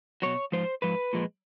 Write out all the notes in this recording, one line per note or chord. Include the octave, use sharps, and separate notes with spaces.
B2 F#3 C#5
G#2 F3 C5
G#2 F3 B4
A#2 F3 G#3